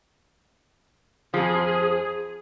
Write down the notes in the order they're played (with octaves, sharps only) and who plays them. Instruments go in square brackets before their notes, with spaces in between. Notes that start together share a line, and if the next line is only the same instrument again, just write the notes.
[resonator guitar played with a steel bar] F2 F3 [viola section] G#4